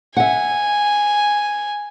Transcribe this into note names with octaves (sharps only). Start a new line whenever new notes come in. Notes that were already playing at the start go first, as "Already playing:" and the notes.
E5 F#5 G#5